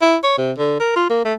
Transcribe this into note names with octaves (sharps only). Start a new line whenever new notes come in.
E4
C#5
C3
D3
A#4
F4
A#3
A3